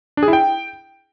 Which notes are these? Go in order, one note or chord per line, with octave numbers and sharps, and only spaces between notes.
D4
G#4
E4
G5